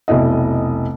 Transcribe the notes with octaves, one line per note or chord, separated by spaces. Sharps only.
F1 B1 E4 D#5